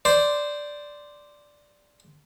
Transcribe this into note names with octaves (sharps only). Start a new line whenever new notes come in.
C5 D5